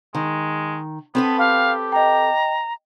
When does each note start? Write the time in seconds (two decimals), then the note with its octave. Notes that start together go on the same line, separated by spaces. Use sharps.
0.15 D#3 G#3
1.15 B3 C4 A4 B4
1.38 G4 F5
1.92 D#5 G5 A#5